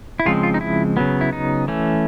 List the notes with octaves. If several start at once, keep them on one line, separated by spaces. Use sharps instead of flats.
E4
C#3 F3 G#3 C4 F4
F4
D#4
E4
C#3 F#3 B3
E4
D#4
E3 A3 C#4